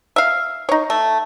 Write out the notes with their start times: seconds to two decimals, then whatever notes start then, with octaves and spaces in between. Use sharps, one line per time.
0.16 E5 F5
0.69 D#4 C#5
0.90 A3